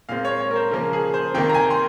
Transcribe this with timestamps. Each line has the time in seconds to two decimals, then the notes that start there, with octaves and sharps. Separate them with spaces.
0.09 A#2 G#3 C4 F5
0.25 C#5
0.40 C#5
0.51 A#4
0.56 C5
0.71 C#3 F3 A#3 A#4
0.93 G#4
1.14 C5
1.34 C3 D#3 A#3 G5
1.49 A#5
1.55 G#5
1.70 C6